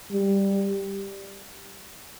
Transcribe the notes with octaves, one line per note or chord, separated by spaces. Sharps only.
G3